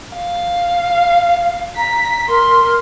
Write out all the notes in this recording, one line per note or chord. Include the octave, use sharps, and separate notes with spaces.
F5
A#5 B6
A#4 C6